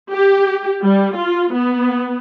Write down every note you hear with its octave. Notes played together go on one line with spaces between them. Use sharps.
G4
G3
F4
B3